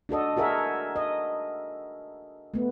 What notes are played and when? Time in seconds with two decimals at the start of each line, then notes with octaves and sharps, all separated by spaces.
0.09 D4 F#4 A4 D#5
0.37 F#4 G#4 A#4 E5
0.96 D#5
2.54 A3 B3